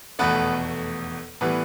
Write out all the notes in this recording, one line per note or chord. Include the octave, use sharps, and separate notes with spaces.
F1 E2 B2 A3 B3 B4
A2 E3 G3 B3 B4